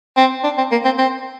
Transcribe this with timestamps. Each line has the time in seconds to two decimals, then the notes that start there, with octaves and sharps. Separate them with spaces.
0.17 C4
0.44 D4
0.58 C4
0.71 A#3
0.85 C4
0.98 C4